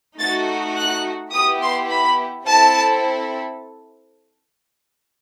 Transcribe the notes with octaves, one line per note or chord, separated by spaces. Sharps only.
A3 D#4 F#4 A6
F#6
B3 E4 G4 D#6
C6
B5
C4 E4 A4 A5